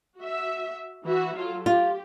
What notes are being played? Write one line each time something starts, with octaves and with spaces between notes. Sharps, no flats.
F#4 E5
E3 F#4 E5
F#3 F4 A4
F4 G4